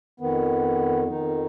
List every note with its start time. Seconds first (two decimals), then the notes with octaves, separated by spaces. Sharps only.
0.20 F2 D#3 B3
1.08 F2 D#3 D#4